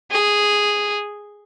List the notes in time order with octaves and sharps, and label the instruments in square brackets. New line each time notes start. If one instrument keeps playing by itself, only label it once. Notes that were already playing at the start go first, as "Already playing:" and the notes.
[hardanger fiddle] G#4